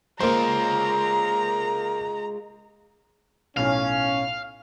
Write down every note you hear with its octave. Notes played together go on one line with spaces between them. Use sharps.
G#3 A#3 F4 C5 A#5
B1 A2 C#4 F5 F6